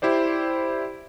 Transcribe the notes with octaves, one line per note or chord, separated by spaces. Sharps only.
E4 G4 C5 D5